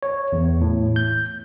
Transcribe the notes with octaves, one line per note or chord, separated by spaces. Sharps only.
C#5
E2
A2
G6